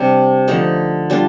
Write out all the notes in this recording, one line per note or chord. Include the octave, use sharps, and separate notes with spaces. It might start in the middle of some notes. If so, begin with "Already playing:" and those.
Already playing: C3 G3 D4 G4
D3 F3 A3 D#4
G3 D4 F4